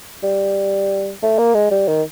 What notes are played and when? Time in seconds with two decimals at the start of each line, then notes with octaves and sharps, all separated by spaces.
0.23 G3
1.22 A3
1.38 A#3
1.54 G#3
1.71 G3
1.88 D#3